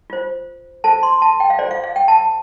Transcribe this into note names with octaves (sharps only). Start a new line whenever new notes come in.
F4 C5
F4 A4 C5 A5
C6
A5
G5
F5
F4 A4 C5 D5
F5
F5
G5
A5